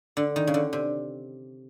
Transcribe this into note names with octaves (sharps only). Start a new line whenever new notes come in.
D3
D#3
C#3
D3
C3